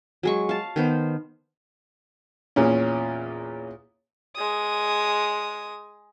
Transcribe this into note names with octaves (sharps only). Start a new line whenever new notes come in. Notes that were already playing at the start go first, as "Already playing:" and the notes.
F#3 G#3 C#6
F5 A5
D#3 B3 C5
E2 A#2 C#4
G#3 D#6